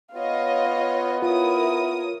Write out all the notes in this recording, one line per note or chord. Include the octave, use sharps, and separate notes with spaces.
B3 F4 C#5 D#5 F5
E4 F4 A#4 C#5 D#6